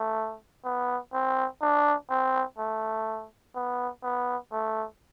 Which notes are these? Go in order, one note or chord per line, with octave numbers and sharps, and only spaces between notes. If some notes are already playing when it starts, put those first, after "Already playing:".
Already playing: A3
B3
C4
D4
C4
A3
B3
B3
A3